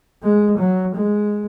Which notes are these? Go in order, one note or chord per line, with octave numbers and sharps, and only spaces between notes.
G#3
F#3
G#3